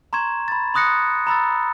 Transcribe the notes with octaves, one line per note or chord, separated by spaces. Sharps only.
A#5 C6 C#6 G#6 E7
B5 A6
B5 C6 D#6 F#6 A#6 C#7
A#5 B5 E6 A6